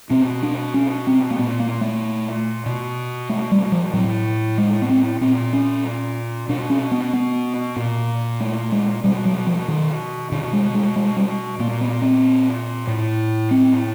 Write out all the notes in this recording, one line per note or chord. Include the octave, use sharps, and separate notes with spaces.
B2 C4
D4
C#4
C4
A#3
A#2 B3
A#3
A3
B2
A3
G3
F3
A2 F#3
G#3
B3
C4
A#2 C4
C#4
B2 D4
C#4
B3
B3
A#2
A3
G#3
B2 G3
F#3
F3
D#3
B2 D3
G#3
G#3
G#3
G3
A#2 A#3
B3
C4
A2
C4